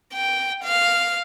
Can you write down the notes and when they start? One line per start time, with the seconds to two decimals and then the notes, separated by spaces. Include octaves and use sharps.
0.14 G5
0.64 F5